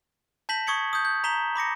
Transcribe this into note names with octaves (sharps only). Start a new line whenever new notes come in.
A5 G6 A#6 B6 E7 F#7
C#6 D#6 G#6 C#7 F#7
D#6 G6
G6
A#5 B6 E7 F#7 G7
B5 D6 A#6 C#7